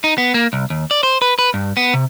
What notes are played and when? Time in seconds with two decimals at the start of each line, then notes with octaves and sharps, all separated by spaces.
0.04 D#4
0.18 B3
0.34 A#3
0.53 C2
0.70 D#2
0.91 D5
1.03 C5
1.22 B4
1.39 B4
1.54 G2
1.77 B3
1.94 C3